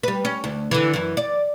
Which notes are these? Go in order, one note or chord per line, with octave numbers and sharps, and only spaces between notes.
G3 B4
C#4
D2
D3 E3
F#2 E3
D5